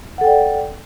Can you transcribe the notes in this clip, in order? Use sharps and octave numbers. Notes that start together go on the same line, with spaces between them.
A4 D5 F#5 G5